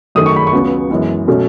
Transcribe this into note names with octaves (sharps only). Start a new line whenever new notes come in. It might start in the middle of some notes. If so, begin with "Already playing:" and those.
F#2 D#3 A3 C#4 D#6
C#6
B5
C#6
C#2 C#3 F#3 B3
F#2 E3 G#3 B3
B2 F#3 A3 C#4